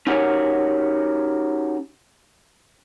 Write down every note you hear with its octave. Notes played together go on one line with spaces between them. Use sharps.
C#4 D#4 F#4 G4 A#4 C#5